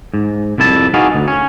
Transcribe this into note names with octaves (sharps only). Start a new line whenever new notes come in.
G#2
C2 F2 E4 A5
D#4 F#4 G#4 B4 F5
D2
C#4